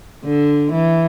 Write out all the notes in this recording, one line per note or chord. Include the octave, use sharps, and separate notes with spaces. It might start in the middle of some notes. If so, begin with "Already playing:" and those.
D3
E3